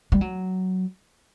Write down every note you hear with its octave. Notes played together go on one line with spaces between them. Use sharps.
G3
F#3